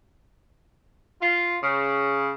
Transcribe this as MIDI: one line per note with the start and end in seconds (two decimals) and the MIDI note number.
1.22 1.56 65
1.63 2.32 49